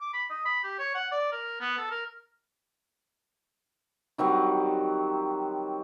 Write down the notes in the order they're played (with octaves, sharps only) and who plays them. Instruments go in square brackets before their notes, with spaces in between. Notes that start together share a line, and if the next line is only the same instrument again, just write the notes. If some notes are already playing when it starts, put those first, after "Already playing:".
[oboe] D6
B5
D#5
B5
G4
C#5
F#5
D5
A#4
B3
A4
A#4
[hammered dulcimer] D#3 F#3 G3 C4